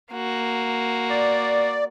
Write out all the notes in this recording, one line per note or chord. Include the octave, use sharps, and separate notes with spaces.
A#3 F#4
D5